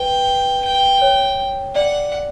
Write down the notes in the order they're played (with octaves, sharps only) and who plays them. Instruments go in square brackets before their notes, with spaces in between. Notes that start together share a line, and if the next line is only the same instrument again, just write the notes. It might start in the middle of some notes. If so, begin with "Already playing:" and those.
Already playing: [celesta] B4 [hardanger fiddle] G5
[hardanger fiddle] G5
[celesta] C#5
[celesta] D5 [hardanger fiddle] F#5